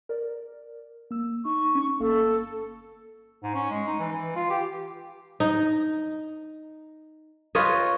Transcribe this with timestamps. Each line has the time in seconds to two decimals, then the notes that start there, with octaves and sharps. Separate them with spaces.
0.09 A#4 D5
1.11 A#3 E6
1.45 D#4 C#6
1.75 C#4
2.00 G1 A#3 A4 F5
3.43 G#2
3.55 C#4
3.70 G#3
3.87 D#4
3.99 E3
4.12 E3
4.35 F4
4.50 G4
5.40 D#4
7.55 F4 B4 C#5 D#5